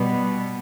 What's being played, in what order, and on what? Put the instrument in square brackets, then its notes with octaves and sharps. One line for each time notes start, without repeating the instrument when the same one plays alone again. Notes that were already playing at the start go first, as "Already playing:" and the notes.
Already playing: [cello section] B2 G3 B3